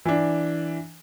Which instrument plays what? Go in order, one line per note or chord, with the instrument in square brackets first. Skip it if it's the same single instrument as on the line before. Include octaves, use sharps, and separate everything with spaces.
[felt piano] E3 D4